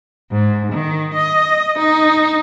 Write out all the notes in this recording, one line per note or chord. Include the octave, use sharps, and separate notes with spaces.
G#2
D#3
D#5
D#4